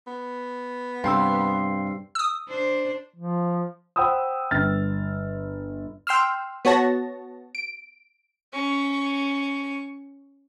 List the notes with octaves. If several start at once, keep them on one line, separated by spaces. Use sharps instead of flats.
B3
G2 C3 F5 G5 C6 E6
D#6 E6
D4 C5
F3
C5 F#5 G5 B5 D#6 E6
G1 F6 A6
G5 C6 E6 F6
B3 F#4 C#5 A5 A#6
D7
C#4 C#6